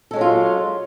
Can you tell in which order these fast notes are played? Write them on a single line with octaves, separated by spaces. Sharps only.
A4 G#3 C#4 F#3 F4